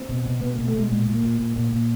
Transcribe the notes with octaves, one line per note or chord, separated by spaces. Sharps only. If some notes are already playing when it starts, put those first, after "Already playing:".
Already playing: C4
B2
B2
B2 B3
B2 A#3
A3
B2 G#3
A#2 G#3
A#2
A#3
A#2
A#2
A#2
A#2